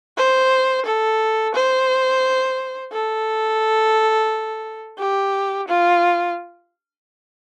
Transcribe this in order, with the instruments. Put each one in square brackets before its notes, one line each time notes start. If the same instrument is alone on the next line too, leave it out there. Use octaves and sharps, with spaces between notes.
[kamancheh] C5
A4
C5
A4
G4
F4